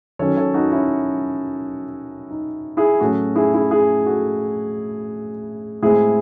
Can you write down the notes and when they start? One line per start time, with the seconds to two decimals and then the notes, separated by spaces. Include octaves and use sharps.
0.19 D#3 F#3 C#4 A4 C#5
0.37 A4 C#5
0.54 D#4 F#4
0.72 C#4 E4
2.31 D#4
2.77 E4 G#4
3.00 A2 F#3 C#4 F#4 A4
3.36 E4 G#4
3.53 E4 G#4
3.71 E4 G#4
4.06 F#4 A4
5.82 A2 G#3 C4 E4 G#4